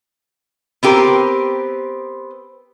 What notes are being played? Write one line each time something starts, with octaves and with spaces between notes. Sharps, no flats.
B3 C4 G4 A#4